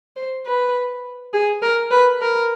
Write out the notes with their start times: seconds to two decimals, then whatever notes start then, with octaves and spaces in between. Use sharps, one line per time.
0.16 C5
0.46 B4
1.33 G#4
1.62 A#4
1.91 B4
2.21 A#4